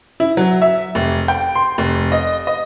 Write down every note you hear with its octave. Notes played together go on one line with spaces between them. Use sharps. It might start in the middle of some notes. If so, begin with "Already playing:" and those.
E4
F#3
E5
F1
G5
C6
F1
D#5
D#5